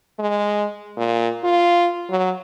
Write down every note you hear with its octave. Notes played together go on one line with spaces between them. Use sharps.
G#3
A#2
F4
F#3